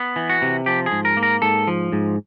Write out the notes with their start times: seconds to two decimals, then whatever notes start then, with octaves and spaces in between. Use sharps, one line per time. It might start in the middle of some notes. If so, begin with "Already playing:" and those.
Already playing: B3
0.16 E3
0.30 F#4
0.42 C3
0.66 F3 G4
0.86 G#4
0.92 G#2
1.05 A#4
1.17 A#3
1.23 A#4
1.42 G#2 A4
1.67 F3
1.92 G#2